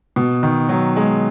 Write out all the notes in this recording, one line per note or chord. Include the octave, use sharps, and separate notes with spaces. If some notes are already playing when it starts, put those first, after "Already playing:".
B2
D#3
F#3
G#3